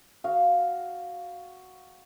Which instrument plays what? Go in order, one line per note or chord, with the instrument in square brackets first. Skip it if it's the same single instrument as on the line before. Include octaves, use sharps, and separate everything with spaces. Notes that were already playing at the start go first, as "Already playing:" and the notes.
[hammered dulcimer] F#4 F5